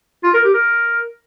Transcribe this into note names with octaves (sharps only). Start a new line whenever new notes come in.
F4
A#4
G4
A#4